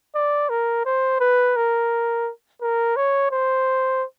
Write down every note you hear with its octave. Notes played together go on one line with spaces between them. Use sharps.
D5
A#4
C5
B4
A#4
A#4
C#5
C5